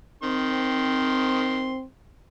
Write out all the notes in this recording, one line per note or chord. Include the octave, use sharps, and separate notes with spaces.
D#3 C4 C6